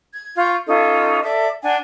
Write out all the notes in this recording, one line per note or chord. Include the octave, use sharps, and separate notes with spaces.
G#6
F4 C#6 G6
C#4 D#4 F4 A4
A4 D5 E5 D6
D4 F#5 G#5